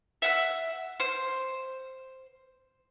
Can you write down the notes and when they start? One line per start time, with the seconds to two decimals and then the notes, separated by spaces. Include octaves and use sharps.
0.22 E5 F#5 E6
1.00 C5